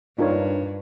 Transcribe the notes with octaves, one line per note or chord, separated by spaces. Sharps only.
G2 D4 D#4 F4 A#4 C#5